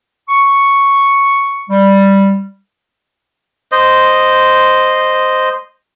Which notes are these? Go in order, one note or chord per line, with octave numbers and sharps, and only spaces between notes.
C#6
G3
C5 D#5